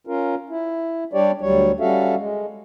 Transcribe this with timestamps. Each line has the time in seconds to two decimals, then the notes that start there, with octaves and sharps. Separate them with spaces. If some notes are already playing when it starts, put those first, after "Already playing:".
0.07 C#4 F4 A#4
0.49 E4
1.13 G3 D4 G4 C#5 D5
1.41 D2 F#3 G3 C#5
1.80 G3 C#4 F#4 A4 E5 F5
2.17 G#3